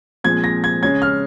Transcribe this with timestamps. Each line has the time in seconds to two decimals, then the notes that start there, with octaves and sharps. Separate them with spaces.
0.24 A#2 F3 G#3 C4 G#6
0.44 A#6
0.64 G#6
0.82 C#3 G#3 C#4 G#6
1.02 F6